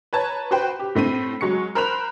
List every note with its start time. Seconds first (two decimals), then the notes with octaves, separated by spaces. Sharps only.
0.13 B4 C#5 A5 A#5 G#6
0.51 F#4 B4 C5 G5
0.79 G4
0.95 A2 A3 C4 D#7
1.41 F#3 G#3 C#6 C#7
1.75 A#4 C5 B5 C6 F#6 F7